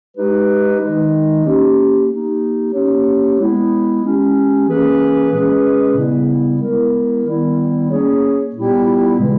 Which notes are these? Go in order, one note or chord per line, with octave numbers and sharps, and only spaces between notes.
G#3 D#4 G4 B4
D#3 G#3 D#4
A#3 C#4 G4
A#3 D#4 G4
A#3 C#4 G4 C#5
G#3 B3 E4
G#3 C#4 G4
E3 A#3 C#4 G#4 B4
A#2 G#3 C#4 G#4 B4
C#3 G3 B3 E4
G#3 B3 E4 A#4
D#3 G3 B3 E4
A#3 C#4 G#4 C#5
A#2 G3 B3 E4 G4
C#3 E3 G#3